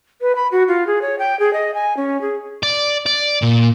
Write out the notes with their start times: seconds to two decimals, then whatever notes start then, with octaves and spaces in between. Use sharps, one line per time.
0.21 B4
0.35 B5
0.52 F#4
0.68 F4
0.87 G#4
1.02 C#5
1.19 G5
1.39 G#4
1.53 D#5
1.74 G#5
1.97 C#4
2.21 G#4
2.63 D5
3.06 D5
3.42 A#2